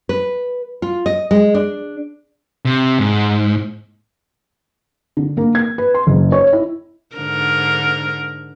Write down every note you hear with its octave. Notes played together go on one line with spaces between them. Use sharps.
B4
F4
D#5
G#3
D4
C3
G#2
D3
A#3
G#6
B4
C6
F#1
C#5
E4
G#2 D3 A#4